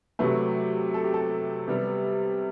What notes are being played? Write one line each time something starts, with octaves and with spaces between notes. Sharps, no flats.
C3 F#3 A3 B4
A4
G4
A4
C3 G3 B3